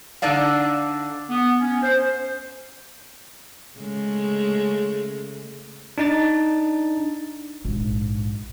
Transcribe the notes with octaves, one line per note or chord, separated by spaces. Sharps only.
D3 D4 D#4 D5 F5
B3
C#4
C5
C#3 G#3 A3
D4 D#4 A6
A#1 G#2